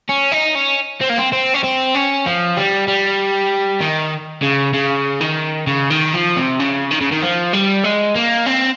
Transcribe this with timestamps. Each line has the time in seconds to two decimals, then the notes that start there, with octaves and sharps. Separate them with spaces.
0.09 C#4
0.32 D#4
0.55 C#4
1.01 C4
1.10 A#3
1.18 C4
1.33 C4
1.54 C#4
1.64 C4
1.95 C#4
2.26 F3
2.57 G3
2.88 G3
3.81 D#3
4.43 C#3
4.74 C#3
5.21 D#3
5.67 C#3
5.90 D#3
6.14 F3
6.37 C3
6.60 C#3
6.91 D#3
7.01 C#3
7.12 D#3
7.22 F3
7.53 G3
7.84 G#3
8.15 A#3
8.47 C4